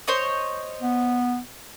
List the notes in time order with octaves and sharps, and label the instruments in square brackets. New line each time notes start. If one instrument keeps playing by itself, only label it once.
[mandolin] C5 C#5 D#5
[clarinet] B3